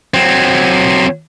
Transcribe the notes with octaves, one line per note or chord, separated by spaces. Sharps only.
F#3 C4